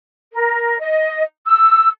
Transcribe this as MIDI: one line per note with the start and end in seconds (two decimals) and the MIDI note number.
0.32 0.78 70
0.79 1.22 75
1.46 1.88 88